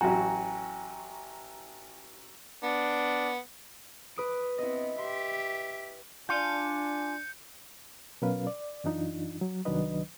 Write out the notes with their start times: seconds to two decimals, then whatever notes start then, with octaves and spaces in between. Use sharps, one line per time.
0.01 A1 F#3 F#4 G5 G#5 A#5
2.63 B3 D4
4.16 B4 D#6 D7
4.58 B3 C4 E4 D#5
4.98 G4 E5 C6
6.29 D4 F4 G#5 G6 C#7 D#7
8.22 B2 F#3 C#4 A#4 B4 F5
8.47 D5
8.84 F#2 E3 D4 D#4 F4
9.41 F#3
9.65 C2 D#3 F#3 D4 B4 D#5